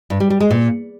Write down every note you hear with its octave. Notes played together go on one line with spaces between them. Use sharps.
G2
G3
G3
G#3
A#2